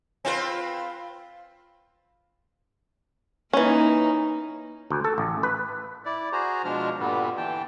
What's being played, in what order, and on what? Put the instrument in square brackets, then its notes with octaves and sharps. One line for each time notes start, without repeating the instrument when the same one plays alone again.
[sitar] C4 F4 B4
[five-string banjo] E3 C#4 [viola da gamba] A#3 D#4
[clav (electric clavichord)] D2
A4
A1
B4
[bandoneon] E4 D5
F#4 G#4 C5 A#5
B2 F3 G#3 D4 F6
G2 A#2 D3 G3 B3
E3 G5 A5